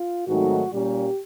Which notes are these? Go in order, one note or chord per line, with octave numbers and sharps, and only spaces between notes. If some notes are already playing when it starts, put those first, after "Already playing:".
Already playing: F4
G#2 D#3 F#3 A3 C4 F#4
A#2 G3 A#3 C#4 G4